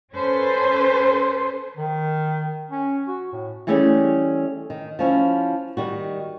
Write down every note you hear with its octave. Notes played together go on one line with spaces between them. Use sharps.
C#4 A4 B4 C5
D#3
C#4
F#4
A2
E3 G3 A3 C#4 G4 G#4
D#3
F3 C#4 E4
D#3 G3 F#4